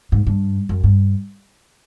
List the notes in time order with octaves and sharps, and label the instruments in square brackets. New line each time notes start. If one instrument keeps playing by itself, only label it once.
[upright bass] G#2
G2
F#2
G2